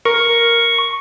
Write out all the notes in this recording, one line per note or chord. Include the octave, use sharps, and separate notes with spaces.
A#4 C#6